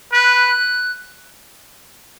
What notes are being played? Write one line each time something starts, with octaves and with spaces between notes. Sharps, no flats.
B4 F#6